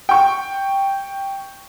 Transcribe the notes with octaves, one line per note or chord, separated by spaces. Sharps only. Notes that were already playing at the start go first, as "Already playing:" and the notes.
G5 C#6